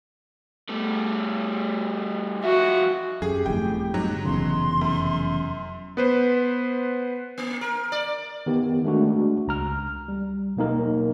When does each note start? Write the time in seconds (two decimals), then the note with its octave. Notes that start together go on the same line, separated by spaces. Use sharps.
0.69 G3 A3
2.44 F3 F#4 E5
3.22 F#2 G4 G#4
3.46 G1 F2 A2 G5
3.94 G#2 F#3
4.25 F1 E2 C#3 C6
4.81 F#2
5.97 B3 B4 C5
7.38 A#3
7.61 A#4
7.92 D5
8.46 D#3 B3 G4
8.84 G#3 A3 D4 F#4
9.47 C#2 A#5 F6
10.08 G3
10.56 B2 F#3 A#3 D#4 A#4